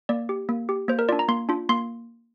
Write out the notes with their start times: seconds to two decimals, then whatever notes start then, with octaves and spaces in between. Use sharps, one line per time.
0.09 A#3 D5
0.29 G4
0.49 A#3
0.69 G4
0.88 A#3 C5
0.99 A#4
1.09 D4 F4 D5
1.19 A#5
1.28 A#3 C6
1.49 D4 F4
1.69 A#3 C6